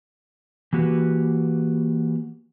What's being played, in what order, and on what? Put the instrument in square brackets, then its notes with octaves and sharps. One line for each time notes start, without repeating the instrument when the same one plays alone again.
[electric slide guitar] E3 A#3 F#4 G4 B4